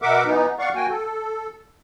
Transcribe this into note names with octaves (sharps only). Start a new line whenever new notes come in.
B2 A#4 E5 F#5 D6
E3 B3 D#4
D5 F5 F#5 C#6
A#3 F#4 G5 G#5
A4